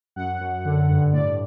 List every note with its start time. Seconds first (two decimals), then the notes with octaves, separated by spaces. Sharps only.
0.16 F#2 F#5
0.41 F#2
0.65 D3
0.89 G2
1.13 A2 D5